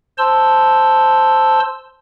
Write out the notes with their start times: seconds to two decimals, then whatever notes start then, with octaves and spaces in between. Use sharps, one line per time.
0.18 C5 A5 C6 E6